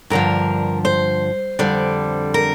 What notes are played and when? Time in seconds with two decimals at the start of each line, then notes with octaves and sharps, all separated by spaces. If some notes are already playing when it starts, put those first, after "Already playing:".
0.10 G2 D3 F3 A#4
0.85 C5
1.59 F2 D3 G3
2.34 A#4